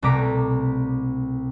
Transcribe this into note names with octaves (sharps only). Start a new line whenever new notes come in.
C2 B2 A3 A#5 D6 B6